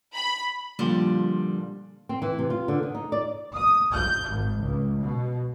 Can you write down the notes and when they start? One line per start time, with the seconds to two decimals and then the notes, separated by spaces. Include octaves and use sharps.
0.15 B5
0.79 A#2 D3 F3 G3
2.09 C4
2.22 E3
2.39 C3
2.50 F4
2.68 D3
2.83 D#3
2.95 D#4
3.12 D5
3.54 D#6
3.92 G6
4.29 G#1
4.59 C#2
5.00 B2